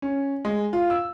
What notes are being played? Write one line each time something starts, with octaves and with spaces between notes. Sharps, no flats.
C#4
G#3
F4
E6